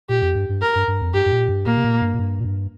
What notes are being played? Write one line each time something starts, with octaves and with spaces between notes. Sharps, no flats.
A#2 G4
F2
G2
G2
A#4
G2
G2
F2
G2 G4
G2
A#2
G2
A#2 A#3
C3
A#2
G2
A#2
G2
A#2
G2